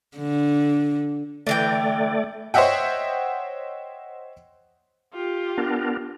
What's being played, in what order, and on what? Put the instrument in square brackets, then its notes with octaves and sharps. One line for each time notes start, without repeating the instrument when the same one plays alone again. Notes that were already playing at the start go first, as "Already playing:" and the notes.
[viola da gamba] D3
[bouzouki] D3 E3 G5 [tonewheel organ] A3 D5
[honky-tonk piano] C5 C#5 D#5 E5 F#5 G5
[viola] F4 G4
[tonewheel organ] B3 D4 A#4